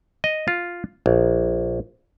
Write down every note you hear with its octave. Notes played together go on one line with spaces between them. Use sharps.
D#5
F4
A#1